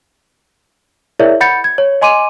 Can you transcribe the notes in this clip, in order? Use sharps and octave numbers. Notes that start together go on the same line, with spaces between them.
E4 G#4 A#4 C#5 D5 E5
F#5 B5 G6 A6 C#7
G#6
C#5
D#5 G#5 C6 D6 D#7